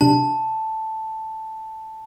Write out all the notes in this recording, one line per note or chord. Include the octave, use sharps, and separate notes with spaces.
C3 D4 A5